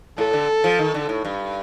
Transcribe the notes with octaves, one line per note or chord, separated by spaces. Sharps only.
A2 A4
D3
F3
D#3
D3
A2
G2